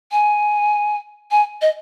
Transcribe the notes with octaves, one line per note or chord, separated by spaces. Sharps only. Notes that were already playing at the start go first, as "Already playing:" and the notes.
G#5
G#5
D#5